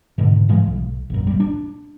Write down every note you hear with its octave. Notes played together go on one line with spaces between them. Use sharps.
G#2 B2 D3
G#2 E3 F3 G#3
B1
A#1 F#2
D#1 G3
D4